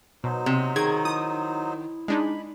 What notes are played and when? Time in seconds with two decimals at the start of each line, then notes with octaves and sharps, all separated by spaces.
0.24 B2 F#3 D#4 C5
0.46 C3
0.76 D#3 G#4 G#6
1.05 E4 D#6
2.08 G#3 D4 D#4 B5